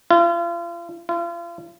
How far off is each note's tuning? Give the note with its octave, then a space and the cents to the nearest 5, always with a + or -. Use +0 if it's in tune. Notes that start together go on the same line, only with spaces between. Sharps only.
F4 -35
F4 -35